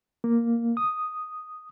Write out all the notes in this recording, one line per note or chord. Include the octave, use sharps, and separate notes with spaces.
A#3
D#6